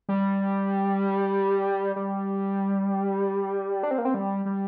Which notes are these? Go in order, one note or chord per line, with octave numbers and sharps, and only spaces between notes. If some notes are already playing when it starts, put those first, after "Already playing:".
G3
G3
D4
C4
A#3
C4
G3
G3